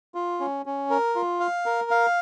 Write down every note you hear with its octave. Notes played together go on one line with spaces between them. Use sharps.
F4
C#4
C#4
A#4
F4
F5
A#4
F5